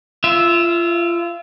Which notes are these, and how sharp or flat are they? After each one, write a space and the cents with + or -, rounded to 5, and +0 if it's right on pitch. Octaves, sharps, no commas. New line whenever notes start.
F4 -30 E5 +0